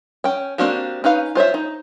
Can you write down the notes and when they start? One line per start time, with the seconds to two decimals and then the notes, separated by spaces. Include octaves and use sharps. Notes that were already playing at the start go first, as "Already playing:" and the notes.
0.24 C#4 G5
0.58 A#3 C4 D4 F#4 G4
1.04 C#4 D#4 B4 F5
1.35 F4 C5 C#5 E5
1.54 D#4